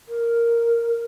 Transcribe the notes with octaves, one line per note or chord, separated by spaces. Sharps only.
A#4